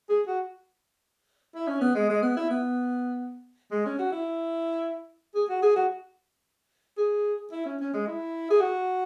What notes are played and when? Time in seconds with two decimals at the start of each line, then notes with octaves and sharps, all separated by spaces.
0.09 G#4
0.27 F#4
1.55 E4
1.67 C#4
1.81 B3
1.95 G#3
2.09 G#3
2.22 B3
2.37 E4
2.50 B3
3.71 G#3
3.86 C#4
3.99 F#4
4.12 E4
5.35 G#4
5.49 F#4
5.62 G#4
5.76 F#4
6.98 G#4
7.52 E4
7.66 C#4
7.80 C#4
7.94 G#3
8.08 E4
8.50 G#4
8.61 F#4